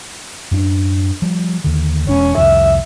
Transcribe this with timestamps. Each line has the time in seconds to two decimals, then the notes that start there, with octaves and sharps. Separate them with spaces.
0.51 F#2 D4
1.22 F3 G3
1.64 D#2 D3
2.08 E1 C#4
2.37 C2 F2 E5